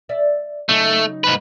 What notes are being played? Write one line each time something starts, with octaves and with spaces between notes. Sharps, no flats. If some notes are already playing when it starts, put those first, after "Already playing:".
D5 E5
C#3 F#3 A3 D#4
G#2 B4